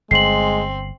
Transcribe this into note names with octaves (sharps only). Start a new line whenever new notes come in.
G1 G#3 C4 C7 F#7